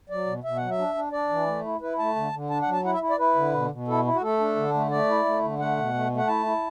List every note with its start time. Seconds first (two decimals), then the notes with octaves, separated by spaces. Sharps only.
0.09 F#3 D5
0.26 B2
0.44 B2 E5
0.57 F#3 F#5
0.70 E5
0.78 D4
0.95 D4
1.12 D4 D5
1.29 E3
1.46 A3
1.64 E4
1.81 E4 B4
1.99 A3 A5
2.16 D3
2.32 D3
2.50 D4 A5
2.62 F#5
2.67 F#3
2.73 A5
2.84 E4 F#5
2.93 E5
3.01 E4
3.10 D5
3.18 E4 B4
3.35 D3
3.53 B2
3.70 B2
3.88 E4 A4
4.05 E4
4.14 F#4
4.21 A3 A4
4.39 D4
4.56 D3
4.74 A3
4.90 A3 D5
5.08 E4
5.25 A3
5.42 D3
5.59 A3 F#5
5.77 B2
5.94 A3
6.11 A3
6.17 F#5
6.28 E4 A5
6.46 E4